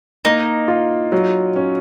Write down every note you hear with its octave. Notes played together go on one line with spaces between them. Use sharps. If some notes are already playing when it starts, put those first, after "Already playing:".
A#3 D#4
F4
F#3
C#4